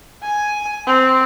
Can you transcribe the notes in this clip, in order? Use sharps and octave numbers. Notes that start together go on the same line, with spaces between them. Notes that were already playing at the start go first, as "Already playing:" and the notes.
G#5
C4